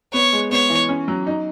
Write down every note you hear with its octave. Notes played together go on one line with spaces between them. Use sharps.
B3 C#5
G#3
B3 C#5
E3
C#4
F#3
D#4